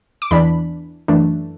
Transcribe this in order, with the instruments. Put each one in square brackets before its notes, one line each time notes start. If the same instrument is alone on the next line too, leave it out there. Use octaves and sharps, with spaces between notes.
[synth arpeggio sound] D6
E2 E3 D4 B5
F#2 E3 A3 D4